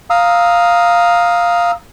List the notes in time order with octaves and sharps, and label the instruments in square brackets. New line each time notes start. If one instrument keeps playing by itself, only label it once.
[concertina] F5 A#5 D#6 E6